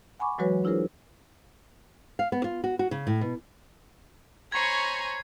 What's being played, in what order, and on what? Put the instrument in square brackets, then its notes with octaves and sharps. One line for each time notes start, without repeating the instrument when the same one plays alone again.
[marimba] F#5 G#5 B5 C#6 D6
E3 F#3 G#3 F#4 B4 C#5
D4 E4 F4 G#4 A#4 C5
[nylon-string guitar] F5
B3
F4
F#4
F#4
C#3
A2
B2
[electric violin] C5 C#5 [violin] G#5 A#5 [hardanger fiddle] B5 C#6 [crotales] G#6 C7